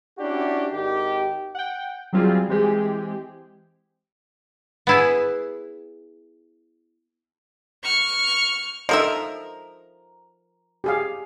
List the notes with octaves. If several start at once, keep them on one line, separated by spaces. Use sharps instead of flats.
C#4 D4 E4 F#4 G4
G#1 D#3 G4
F#5 G5
F#3 G3 C4 F4 G4 G#4
E3 G#3 C4 G4 G#4
B3 E4 G#4
C#6 F6
F3 D#4 A4 A#4 D#5 E5
G4 G#4 F5